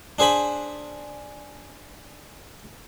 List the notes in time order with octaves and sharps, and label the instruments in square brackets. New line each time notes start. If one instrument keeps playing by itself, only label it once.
[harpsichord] D4 G#4 C5 G#5 B5